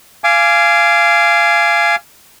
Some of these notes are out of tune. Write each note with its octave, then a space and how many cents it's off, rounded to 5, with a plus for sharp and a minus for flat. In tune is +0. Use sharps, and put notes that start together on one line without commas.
F5 -20 G#5 +10 D6 +0